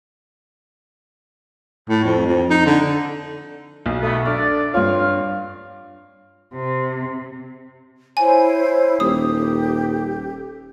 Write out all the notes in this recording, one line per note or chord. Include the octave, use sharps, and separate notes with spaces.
A2
F2
F2
D#4
D3
B1
A3 B3
D4 A4 D5 F6
G2 F4 C#5 F5
C3
E4 C5 C#5 G#5
D#1 G4 A4 D#6